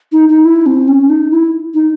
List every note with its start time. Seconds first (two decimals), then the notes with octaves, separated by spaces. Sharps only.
0.12 D#4
0.29 D#4
0.45 E4
0.66 C4
0.88 C#4
1.09 D#4
1.31 E4
1.74 D#4